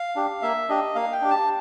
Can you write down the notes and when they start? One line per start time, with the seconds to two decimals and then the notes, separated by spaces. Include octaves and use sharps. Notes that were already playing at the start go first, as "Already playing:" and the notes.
Already playing: F5
0.16 D4 G4
0.42 A#3 E5
0.69 D4 G4 D#5
0.95 A#3 F5
1.12 G5
1.21 D4 G4
1.30 A5